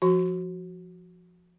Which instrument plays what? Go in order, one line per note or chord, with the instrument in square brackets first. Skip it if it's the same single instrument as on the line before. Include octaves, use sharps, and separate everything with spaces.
[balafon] F3 F#4